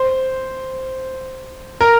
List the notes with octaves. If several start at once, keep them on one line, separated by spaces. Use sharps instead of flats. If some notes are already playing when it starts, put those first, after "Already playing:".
Already playing: C5
A#4